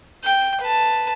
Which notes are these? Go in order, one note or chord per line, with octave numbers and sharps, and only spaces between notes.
G5
B4 A5